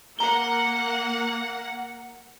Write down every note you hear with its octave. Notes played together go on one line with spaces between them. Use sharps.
A#3 F#5 A#5 G7